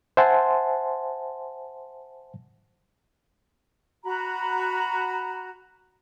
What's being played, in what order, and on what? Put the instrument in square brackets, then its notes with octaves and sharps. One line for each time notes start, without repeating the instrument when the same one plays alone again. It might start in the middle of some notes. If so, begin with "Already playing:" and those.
[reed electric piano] C5 E5 F#5 G#5 A5 C6
[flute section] F#4 A#5 B5